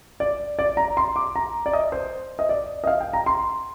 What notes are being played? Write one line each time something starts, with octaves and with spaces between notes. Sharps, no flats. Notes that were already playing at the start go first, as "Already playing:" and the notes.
D5
D5
A#5
C6
D6
A#5
D5
D#5
C5
D#5
D5
D#5
F5
G5
A#5
C6